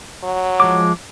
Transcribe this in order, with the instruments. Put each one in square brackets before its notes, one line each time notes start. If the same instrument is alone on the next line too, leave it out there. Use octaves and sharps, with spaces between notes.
[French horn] F#3
[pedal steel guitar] F3 G#3 D6